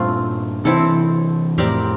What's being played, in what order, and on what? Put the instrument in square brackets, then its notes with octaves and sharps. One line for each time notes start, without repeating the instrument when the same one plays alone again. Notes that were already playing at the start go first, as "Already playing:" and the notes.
Already playing: [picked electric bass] G2 A#2 [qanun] A3 C4 F4
[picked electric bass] C3 E3 [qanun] C4 E4 A4
[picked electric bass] F2 A2 [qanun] C4 G4 A#4 D5